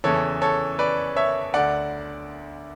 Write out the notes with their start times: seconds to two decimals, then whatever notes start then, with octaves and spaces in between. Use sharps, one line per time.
0.04 E2 C#3 E3 A4 C#5
0.42 A4 C#5
0.79 B4 D5
1.16 C#5 E5
1.54 D2 D3 D5 F#5